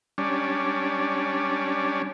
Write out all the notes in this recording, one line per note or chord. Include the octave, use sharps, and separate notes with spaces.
G3 C#4 D4